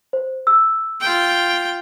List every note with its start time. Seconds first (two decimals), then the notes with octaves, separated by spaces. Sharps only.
0.13 C5
0.47 E6
1.01 F4 G5